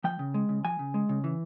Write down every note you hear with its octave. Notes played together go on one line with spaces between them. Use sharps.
F3 G5
C#3
G#3
C#3
F3 G#5
C#3
G#3
C#3
E3